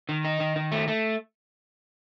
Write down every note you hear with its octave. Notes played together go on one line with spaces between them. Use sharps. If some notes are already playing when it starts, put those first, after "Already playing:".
D#3
D#4
D#3
D#3
A3
A3